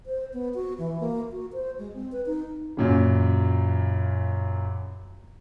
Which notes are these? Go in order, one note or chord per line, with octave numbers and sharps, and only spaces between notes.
C5
B3
F#4
E3
A#3
F#4
C5
G#3
C4
B4
D#4
F#2 A#2 C#3